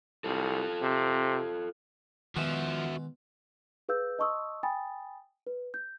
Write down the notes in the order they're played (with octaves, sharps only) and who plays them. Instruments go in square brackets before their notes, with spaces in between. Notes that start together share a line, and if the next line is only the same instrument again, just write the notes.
[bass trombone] C2 [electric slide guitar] F4 A4
[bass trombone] C3
[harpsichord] B2 G#3 [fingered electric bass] D#3 [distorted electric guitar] F3 [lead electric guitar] F#4 E5
[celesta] G#4 B4 F5 E6 G6
D#5 A5 C6 C#6 D#6 E6
G5 G#5 B5 D#6 A6
B4
G6